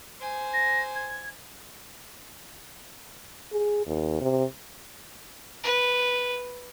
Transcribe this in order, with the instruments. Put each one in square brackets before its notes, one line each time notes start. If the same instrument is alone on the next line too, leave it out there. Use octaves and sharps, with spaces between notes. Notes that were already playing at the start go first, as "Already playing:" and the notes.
[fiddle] C5 G#5
[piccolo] A#6
G#6
[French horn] G#4
D#2
C3
[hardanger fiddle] B4